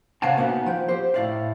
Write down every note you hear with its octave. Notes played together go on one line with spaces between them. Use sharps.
C3 C#4 F5 F#5 A5 A#5
A#3 B3 C#4 D#4 F#4
F3 G5
G4 C5
A2 E4 D5 E5 F5